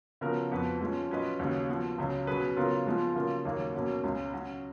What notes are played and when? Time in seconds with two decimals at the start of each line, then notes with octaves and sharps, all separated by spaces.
0.21 C#3 F3 B3 F#4 A#4
0.52 F2 F3 B3 F#4 B4
0.81 F3 G#3 C#4
1.10 F#3 C#4 F4 B4 D#5
1.39 D#2 C#3 F#3
1.69 F3 B3 F#4
1.98 C#2 C#3 F#3
2.27 B2 F#3 C#4 G#4 B4
2.56 C#3 F#3 B3 F4 A#4
2.87 F3 G#3 B3 F4
3.15 C#3 F#3 A#3 F4 A#4
3.45 D#2 C#3 F#3 A#3 D#4
3.74 B2 F#3 A#3 C#4 F#4
4.04 C#2 C#3 G#3 C#4
4.33 F#3 C#4 F#4